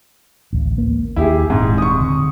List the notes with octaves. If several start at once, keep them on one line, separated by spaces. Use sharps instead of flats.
A1 D2
A#3
D#2 E4 G4 G#4
D#1 G#2 C4
C#6 D#6
D3